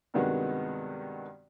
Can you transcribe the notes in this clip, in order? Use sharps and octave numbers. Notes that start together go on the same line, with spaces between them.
G2 C3 D#3 G#3 B3 F#4